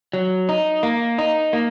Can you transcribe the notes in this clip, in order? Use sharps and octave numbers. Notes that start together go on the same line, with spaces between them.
F#3
D#4
A#3
D#4
A#3